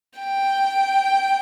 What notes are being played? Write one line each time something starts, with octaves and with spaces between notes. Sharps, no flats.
G5